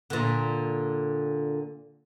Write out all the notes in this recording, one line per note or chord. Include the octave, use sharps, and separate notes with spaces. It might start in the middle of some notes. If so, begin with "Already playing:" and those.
A#2 D3